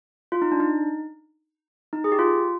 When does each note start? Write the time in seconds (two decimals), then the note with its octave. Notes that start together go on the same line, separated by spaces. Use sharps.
0.32 F4
0.42 D#4
0.52 D4
0.60 D#4
1.93 D#4
2.04 G#4
2.12 G4
2.19 F4